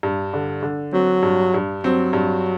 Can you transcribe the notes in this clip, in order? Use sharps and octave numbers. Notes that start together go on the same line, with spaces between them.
G2
D3
D3
F#3 C4
G2
G2
F#3 C4
G2